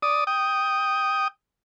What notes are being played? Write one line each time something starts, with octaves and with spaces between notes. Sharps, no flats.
D5 D#6
G5 D#6